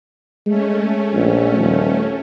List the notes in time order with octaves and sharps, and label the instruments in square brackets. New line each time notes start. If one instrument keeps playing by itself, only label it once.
[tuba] G#3 [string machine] A3 C#4
[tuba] A#1
D#1